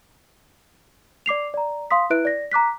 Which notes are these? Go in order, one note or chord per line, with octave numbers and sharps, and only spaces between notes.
D5 D6 C7 F7
D5 A#5
F5 C6 D#6 B6
E4 B4 E5 F#6 D7
D5 A#6
A#5 D6 F#6 B6